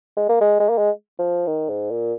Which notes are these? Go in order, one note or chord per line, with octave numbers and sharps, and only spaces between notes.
G#3
A#3
G#3
G#3
A#3
G#3
F3
D#3
G#2
A#2